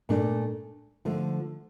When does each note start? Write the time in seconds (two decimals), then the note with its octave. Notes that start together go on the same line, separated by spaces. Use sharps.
0.09 A#2 A3 D4 A4 D5
1.05 D3 F3 A3